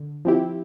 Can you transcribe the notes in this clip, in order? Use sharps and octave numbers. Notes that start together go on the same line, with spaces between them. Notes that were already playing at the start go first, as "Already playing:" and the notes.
Already playing: D3
F3 C4 E4 G4